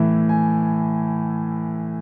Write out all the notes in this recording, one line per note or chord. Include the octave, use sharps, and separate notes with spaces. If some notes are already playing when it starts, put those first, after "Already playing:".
Already playing: A2 E3 E5
G#5